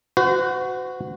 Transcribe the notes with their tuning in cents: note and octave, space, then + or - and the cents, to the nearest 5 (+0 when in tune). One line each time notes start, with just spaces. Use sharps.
F#4 +0 C5 -45